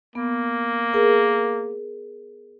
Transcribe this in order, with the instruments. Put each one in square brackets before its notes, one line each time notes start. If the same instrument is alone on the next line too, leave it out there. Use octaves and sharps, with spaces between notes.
[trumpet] A#3 [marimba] B3
[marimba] G#4 A#4